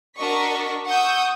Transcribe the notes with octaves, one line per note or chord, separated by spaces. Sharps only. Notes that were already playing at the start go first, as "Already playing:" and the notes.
D4 F#4 A#4 D#5 C#6 B6
F#5 C#6 D#6 E6 G6